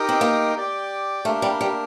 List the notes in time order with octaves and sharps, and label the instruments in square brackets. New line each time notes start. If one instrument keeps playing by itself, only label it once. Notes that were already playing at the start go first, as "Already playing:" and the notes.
Already playing: [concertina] D#4 G4 A#4 D#5 G5
[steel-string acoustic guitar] C4
A#3
[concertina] G4 D5 G5
[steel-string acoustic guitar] A3 [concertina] A#3 D4 G4 A#4
[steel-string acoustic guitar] G3
G3